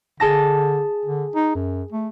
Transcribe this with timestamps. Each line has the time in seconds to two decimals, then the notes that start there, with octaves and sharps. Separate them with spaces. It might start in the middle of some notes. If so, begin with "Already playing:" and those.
0.20 D3 G#4 A5 A#6
1.06 D3
1.35 D#4
1.55 F#2
1.92 A3